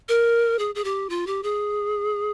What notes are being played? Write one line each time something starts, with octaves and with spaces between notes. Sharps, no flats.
A#4
G#4
G#4
G4
F4
G4
G#4